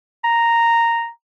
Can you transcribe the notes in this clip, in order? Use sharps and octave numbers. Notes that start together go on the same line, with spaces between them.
A#5